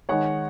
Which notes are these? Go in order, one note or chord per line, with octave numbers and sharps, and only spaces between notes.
D#3 G#3 D#4 C#5 F#5